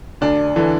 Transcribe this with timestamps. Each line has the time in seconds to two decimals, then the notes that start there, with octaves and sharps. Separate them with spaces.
0.21 D2 D4
0.56 D3 E3